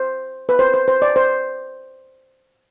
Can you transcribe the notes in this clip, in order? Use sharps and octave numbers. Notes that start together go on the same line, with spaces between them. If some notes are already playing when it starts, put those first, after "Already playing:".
Already playing: C5
B4
C5
C5
C5
D5
C5